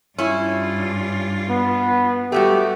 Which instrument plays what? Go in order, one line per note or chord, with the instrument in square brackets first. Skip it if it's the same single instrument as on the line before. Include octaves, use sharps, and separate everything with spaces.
[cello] G2 F4 [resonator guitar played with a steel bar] C#4 E4
[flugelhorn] B3
[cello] G3 [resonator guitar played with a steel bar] A3 B3 F#4 [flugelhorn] G4